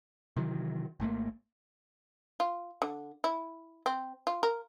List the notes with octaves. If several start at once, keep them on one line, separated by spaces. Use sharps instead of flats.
C3 D#3 E3 F#3
G#1 G#2 A3 A#3
F4
D3
E4
C4
F4
A#4